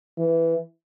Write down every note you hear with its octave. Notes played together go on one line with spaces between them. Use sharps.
E3